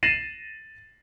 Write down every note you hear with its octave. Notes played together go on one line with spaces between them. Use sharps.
A6 A#6 C7 D#7 E7 F#7